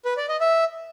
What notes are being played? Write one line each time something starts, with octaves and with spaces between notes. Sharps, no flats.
B4
D5
D#5
E5